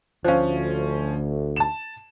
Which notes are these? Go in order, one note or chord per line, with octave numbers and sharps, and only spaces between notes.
D2 F3 C#4 C5 F5
A5 E7